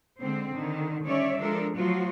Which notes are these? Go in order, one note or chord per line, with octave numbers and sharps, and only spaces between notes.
D3 G#3 C4
D3 D#3
D3 G3 C#4 C#5 D5 E5
F3 G#3 D4 A4 A#4
F3 F#3 A3 F4 F#4